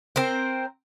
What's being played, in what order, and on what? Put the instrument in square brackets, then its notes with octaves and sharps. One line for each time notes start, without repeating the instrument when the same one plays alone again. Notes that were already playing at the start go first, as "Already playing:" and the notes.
[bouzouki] C4 A#4 C5